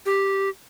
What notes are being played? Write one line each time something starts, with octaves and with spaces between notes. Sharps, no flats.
G4